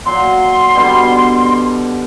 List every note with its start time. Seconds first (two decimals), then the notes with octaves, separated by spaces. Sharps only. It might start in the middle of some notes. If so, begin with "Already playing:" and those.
0.06 A#2 F#3 C6
0.75 B2 D3 G3